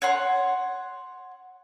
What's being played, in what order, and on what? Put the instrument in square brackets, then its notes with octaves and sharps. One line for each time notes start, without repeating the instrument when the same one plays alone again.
[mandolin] C#5 F#5 C6